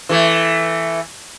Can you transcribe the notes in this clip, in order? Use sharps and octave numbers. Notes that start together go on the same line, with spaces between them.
E3 A3